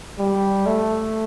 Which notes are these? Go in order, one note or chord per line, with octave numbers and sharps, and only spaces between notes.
G3
A3